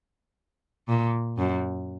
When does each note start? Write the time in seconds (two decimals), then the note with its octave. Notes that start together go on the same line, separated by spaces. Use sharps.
0.88 A#2
1.38 F#2